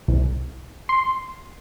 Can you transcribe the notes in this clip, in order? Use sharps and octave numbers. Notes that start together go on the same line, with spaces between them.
C2
C6